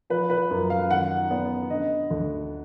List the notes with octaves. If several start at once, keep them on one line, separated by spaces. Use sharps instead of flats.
F3 B4
B4
F#2
F5
D#3 F#5
B3
D3 D#5
D2